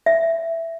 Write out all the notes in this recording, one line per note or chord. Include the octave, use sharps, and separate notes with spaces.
E5